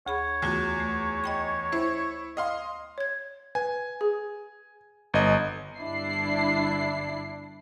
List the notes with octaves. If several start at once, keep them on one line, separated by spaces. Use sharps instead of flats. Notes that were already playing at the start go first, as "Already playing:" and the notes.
D2 G#4 C#5 B5
E2 A3 F4 F#4
A3
D#5 G5 B5
E4 C5
D#5 F5 C6
C#5 G#6
B4 G#5
G#4
G1 D#5
G1 G2 D4 E4 C7